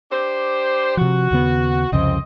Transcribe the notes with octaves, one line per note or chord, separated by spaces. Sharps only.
D4 G4 C5
C3 F3 F#4
D#2 C#3 B3
C2 F2 C#3 C4 D#5